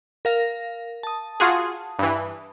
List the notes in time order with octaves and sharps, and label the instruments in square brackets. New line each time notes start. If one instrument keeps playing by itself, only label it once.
[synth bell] A#4 F5 A#6
A5 D#6
[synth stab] F4 F#4 G#4
G2 E3